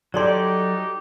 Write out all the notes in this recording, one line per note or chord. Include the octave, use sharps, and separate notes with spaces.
F#3 D#4 G4 A4 C#5 D5 G5 C6